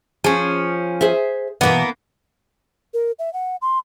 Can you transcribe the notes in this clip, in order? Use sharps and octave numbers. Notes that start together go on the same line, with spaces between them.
F3 C#4 G#4
G#4 C5 E5
B2 E3 A#3 B3
A#4
E5
F#5
C6